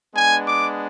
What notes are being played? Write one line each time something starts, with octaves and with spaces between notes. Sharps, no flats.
G#3 B3 D4 G#5
D6